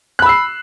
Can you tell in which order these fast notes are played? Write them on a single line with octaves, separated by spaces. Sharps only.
F#6 B5 E6 C7